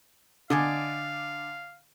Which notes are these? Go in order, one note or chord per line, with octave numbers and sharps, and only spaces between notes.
D3 D5 D#5 F5 G#5